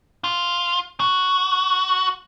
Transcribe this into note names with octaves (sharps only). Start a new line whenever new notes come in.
F4
F#4